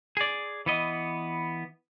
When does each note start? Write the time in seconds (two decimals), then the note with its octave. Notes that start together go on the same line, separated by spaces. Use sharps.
0.17 G#4 D5
0.66 E3 B3 D#5